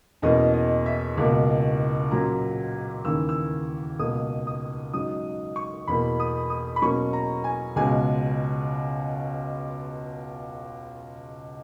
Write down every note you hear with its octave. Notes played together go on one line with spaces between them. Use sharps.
E2 B2 A#3 C#4 D#5
D#5
E5
C#2 B2 A#3
A#2 F#3 C#4 A#5
D#2 C#3 E3 E6
E6
C#2 B2 A#3 D#6
D#6
G#2 F#3 C#4 D#6
C#6
E2 B2 A#3 B5
D#6
D#6
B5
B2 F#3 A#3 C#4 C#6
A#5
G#5
C#2 B2 G#3 C#4 G#5